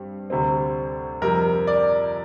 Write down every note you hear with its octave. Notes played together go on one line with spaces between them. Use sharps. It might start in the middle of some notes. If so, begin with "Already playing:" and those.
Already playing: G2 G3 C4
D2 C3 G3 C4
F2 C3 G3 A#4
D5